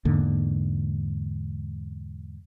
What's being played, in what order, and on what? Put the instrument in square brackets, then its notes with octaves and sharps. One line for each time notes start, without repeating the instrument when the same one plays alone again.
[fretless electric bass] E2 G#2 D3 A#3